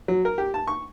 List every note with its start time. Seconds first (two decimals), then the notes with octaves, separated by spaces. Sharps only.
0.08 F#3
0.25 A#4
0.38 G4
0.54 A5
0.67 C#6